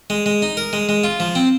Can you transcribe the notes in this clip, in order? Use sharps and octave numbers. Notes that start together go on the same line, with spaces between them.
G#3
G#3
D#4
A#4
G#3
G#3
F4
F3
C4